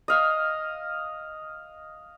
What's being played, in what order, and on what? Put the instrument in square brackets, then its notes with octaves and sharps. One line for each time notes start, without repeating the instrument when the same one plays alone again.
[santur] D#5 F5